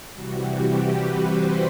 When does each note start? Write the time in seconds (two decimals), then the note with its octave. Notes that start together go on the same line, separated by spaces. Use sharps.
0.14 C3 E3 G3 F#4
0.48 G4
0.83 B4
1.18 C5